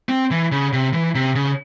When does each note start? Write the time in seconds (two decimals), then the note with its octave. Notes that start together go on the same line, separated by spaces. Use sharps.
0.09 C4
0.31 E3
0.52 C#3
0.73 C3
0.93 E3
1.15 C3
1.35 C#3